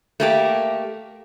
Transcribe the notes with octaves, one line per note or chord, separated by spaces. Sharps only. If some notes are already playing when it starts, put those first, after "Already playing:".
A3 A#3 G4